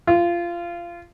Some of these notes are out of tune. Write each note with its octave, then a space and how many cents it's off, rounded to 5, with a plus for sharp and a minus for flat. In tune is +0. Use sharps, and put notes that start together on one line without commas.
F4 -20